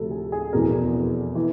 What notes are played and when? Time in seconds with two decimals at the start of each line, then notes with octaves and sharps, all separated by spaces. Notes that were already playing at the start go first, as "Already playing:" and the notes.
Already playing: D2 C3 F3 A4
0.11 G#4
0.32 G#4
0.53 F1 E2 B2 A#4
1.35 E3